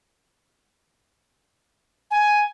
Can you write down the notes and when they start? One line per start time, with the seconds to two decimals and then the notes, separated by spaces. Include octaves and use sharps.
2.11 G#5